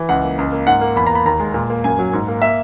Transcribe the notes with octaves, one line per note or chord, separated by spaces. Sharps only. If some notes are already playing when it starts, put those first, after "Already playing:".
Already playing: E3
C#2 F#5
A#3
C#2
A#3
G#2 F#5
A#3
E2 B5
A#5
A#3 B5
D#2 A#5
G#3
A#2
A#3
F#2 G#5
F#3
G#2
A#3
A#3 E5